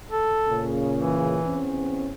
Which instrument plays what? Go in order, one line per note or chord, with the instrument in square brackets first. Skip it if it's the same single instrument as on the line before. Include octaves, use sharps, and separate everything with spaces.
[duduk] A4
[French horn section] A#2 C#3
[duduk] E3
[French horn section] E2 C4 C#4